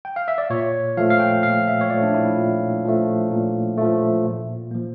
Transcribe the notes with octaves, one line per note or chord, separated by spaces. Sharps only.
G5
F5
E5
D5
A#2 C#5
F3 A3 F5
F5
G5
A#2 F5
E5
C#5
F3 A3 D5
D4
E4
A#2
F3 A3
A#2
F3 A3
A#2
F3 A#3